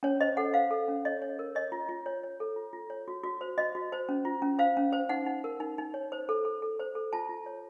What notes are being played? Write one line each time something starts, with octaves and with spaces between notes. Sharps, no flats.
C#4 C#5
C5 D#5
A4 F#5
C5 F5
A4
C#4
C#5 D#5
C#5
A#4
C#5 D#5
F4
F4
C#5
C#5
A4
F4
F4
C#5
F#4
F#4
C5
F#4 D#5
F#4
C5
C#4
F4
C#4
C5 F5
C#4
C5
D#4 F#5
D#4
A#4
D#4
D#4
C#5
C5
A4
A4
A4
C5
A4
F4 A5
F4
C#5